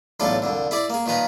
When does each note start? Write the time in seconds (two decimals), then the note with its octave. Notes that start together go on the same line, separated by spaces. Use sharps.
0.20 B1 E2 A2 D4 F4 A4
0.42 C2 F2 D3
0.71 E4 G#4 D5
0.90 A#3 G#4
1.06 A#2 D#3 F3 B4 A#5